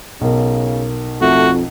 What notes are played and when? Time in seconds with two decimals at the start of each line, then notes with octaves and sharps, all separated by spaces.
0.21 B1 C#3 A#4
1.21 F2 A3 F#4